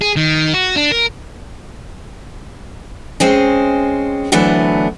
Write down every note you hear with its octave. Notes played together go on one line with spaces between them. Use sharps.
G#4
D#3
F#4
D4
A#4
G#3 C4 C#4
D2 E3 F#3 A3 B3 D4